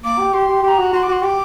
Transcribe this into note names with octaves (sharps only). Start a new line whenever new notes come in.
A#3 D6
G4
G4 C6
G4
G4 C6
A#5
F#4
F#4 C6
D6
F#4 C6
G4 D6